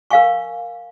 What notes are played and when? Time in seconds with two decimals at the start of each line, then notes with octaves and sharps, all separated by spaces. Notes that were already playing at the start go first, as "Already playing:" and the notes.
0.11 A#4 F5 G#5 C#6